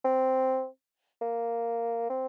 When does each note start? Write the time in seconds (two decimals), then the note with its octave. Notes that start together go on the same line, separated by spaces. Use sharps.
0.05 C4
1.22 A#3
2.09 C4